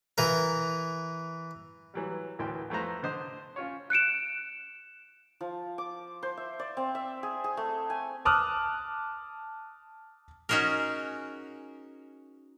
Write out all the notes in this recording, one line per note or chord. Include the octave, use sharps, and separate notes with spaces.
E3 A#4
E3 F#3 G3
D2 A2 E3 A#4 G5 C6
F2 A3 B4 C5 A#5
D3 C5 D#5
C#4 F4 C#5
F#6 C#7 D7 E7
F3
D6
C5
E5
D5
C4
E5
G#4
G#4
A3
G#5
A5 D6 D#6 F6 F#6
C#4 D#4 F#4 G#4 A#4